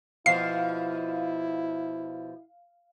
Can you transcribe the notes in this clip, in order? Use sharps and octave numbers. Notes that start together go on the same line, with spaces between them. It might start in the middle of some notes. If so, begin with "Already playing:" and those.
B2 F3 E4 F5 C7